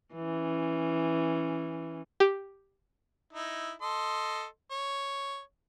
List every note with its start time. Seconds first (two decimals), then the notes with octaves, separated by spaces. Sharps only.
0.15 E3 C#4
2.20 G4
3.33 D#4 E4
3.82 A4 D#5 C6
4.71 C#5